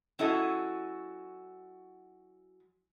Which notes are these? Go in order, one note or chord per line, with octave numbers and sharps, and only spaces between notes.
F#3 C#4 E4 F#4 A4 D#5